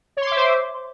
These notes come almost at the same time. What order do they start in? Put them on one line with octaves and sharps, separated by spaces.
C#5 C6 D6 E5 C5